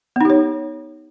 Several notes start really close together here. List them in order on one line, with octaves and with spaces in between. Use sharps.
B3 D#4 G4 C#5